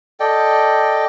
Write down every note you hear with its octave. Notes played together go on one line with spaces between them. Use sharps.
A4 D5 D#5 G5